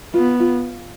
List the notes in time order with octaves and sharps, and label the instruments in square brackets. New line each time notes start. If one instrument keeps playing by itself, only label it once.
[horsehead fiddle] B3 [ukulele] F4
[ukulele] F4